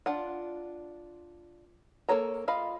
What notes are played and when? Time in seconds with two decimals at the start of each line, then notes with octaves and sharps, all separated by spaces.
0.06 D4 F4 F#5
2.09 A#3 C#4 A4 C#5 A#5
2.48 F4 D#5 F5 B5